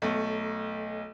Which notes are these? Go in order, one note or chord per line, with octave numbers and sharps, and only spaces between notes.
B1 A3